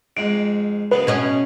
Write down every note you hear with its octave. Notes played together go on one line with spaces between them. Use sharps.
F2 G#2 D7
F#2 C#3 B3 B4
B2 C#4 D#5